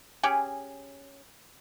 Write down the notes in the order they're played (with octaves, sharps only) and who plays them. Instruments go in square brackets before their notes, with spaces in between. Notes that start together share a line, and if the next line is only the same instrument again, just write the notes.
[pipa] C#4 G4 G#4